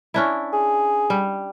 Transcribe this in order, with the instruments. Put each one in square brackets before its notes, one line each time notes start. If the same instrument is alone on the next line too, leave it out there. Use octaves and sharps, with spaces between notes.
[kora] C#4 D4 E4
[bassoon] G#4
[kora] G3